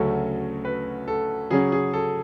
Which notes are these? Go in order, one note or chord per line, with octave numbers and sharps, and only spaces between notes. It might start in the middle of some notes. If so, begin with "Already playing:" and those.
Already playing: D2 C#3 F#3 A3 C#4 A4
B4
A4
C#3 F#3 C#4 G#4
G#4
A4